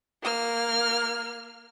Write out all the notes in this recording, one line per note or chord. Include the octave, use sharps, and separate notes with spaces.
A#3 F6